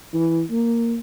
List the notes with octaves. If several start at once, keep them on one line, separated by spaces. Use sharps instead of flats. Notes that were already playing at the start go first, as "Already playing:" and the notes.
E3
A#3